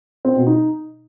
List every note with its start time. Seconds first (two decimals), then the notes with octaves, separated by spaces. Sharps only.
0.25 C4
0.36 B2
0.47 D#4